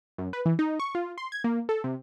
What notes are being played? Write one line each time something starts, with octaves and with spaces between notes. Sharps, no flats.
F#2
B4
E3
D#4
C#6
F4
C6
G#6
A#3
A4
C3